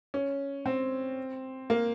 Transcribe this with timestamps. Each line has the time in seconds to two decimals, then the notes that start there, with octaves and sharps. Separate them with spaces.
0.14 C#4
0.66 C4
1.70 A#3